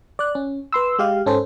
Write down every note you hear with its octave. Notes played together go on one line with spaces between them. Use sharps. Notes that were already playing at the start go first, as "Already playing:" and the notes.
D5 F#6
C#4
B4 C6 E6
G#3 G4 F5
G#2 C#4 A4 C5